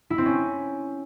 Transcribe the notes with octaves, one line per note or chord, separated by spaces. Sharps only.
E4
C4
C#4